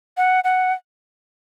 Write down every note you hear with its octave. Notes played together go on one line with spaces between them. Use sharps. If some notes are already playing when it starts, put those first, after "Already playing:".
F#5
F#5